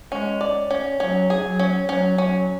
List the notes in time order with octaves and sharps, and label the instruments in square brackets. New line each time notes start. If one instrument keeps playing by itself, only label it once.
[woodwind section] G#3 [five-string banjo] C#4
[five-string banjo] D5
C#4
[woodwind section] F#3 [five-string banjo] C#4
[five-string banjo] G#4
[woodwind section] F#3
[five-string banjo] C#4
[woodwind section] F#3 [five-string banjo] C#4
[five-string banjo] C#4